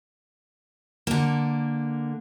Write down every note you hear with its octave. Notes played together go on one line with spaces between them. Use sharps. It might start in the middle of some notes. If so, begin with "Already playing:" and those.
D3 A#3